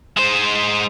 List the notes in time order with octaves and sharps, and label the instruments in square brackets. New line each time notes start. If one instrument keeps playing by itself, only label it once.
[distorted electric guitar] G#3 C5